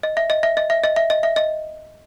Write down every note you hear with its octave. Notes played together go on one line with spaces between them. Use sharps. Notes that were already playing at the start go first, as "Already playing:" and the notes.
D#5
E5
D#5
E5
D#5
E5
D#5
E5
D#5
E5
D#5